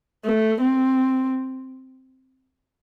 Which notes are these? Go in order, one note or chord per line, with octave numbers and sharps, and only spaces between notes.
A3
C4